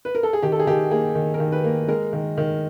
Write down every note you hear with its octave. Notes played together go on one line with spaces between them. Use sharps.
B4
A#4
A4
G#4
D#3 G4
A4
G#4
D#3 G4
A#3 G#4
D#3
A#4
D#3
B4
A#3
G#3 A#4
D#3
D#3